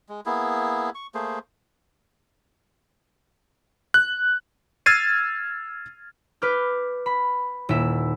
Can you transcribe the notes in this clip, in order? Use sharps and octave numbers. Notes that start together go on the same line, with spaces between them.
G#3
A#3 B3 E4 G#4
C#6
A3 A#3 G#4 C5
F#6
E6 F6 G#6 A6 C7 D#7
B4 D6 F6 G6
B5
D#1 E4 E5